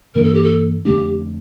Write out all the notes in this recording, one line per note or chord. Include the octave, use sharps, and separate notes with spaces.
G2 E3 A#3 D4 A#4
A4
G4
A4
F2 D3 A3 D4 G4